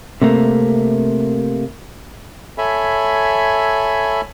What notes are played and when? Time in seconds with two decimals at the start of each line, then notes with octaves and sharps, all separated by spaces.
0.22 C3 A3 A#3
2.58 A4 C#5 E5 G#5 B5